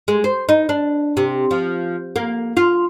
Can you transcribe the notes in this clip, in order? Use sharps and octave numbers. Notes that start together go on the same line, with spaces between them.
G#3
C5
D#4
D4
C3
F3
A#3
F4